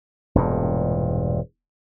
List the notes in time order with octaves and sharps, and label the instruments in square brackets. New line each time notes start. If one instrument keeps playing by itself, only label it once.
[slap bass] E1 G2 A#2